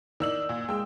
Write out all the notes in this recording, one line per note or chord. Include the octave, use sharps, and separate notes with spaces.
D#3 D5 E6 F#7
A#2
G#3 G5 E6